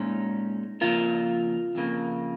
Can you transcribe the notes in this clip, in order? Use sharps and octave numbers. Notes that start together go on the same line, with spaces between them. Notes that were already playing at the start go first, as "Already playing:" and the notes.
Already playing: A#2 G#3 C#4 D#4
F2 C#3 A#3 F4 A#4
F2 C#3 A#3